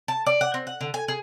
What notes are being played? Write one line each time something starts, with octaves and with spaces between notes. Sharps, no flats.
A5
D5
F#5
C4
F#5
D3
G#5
G#4